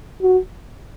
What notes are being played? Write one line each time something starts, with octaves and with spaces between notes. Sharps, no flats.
F#4